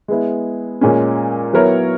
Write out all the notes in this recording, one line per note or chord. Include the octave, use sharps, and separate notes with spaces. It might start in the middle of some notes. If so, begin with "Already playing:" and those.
G#3 B3 E4
A#2 G#3 C#4
F#3 B3 E4 A#4 C#5